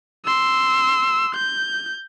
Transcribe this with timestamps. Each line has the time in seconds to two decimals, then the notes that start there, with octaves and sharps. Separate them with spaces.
0.25 C6 E6
1.35 G6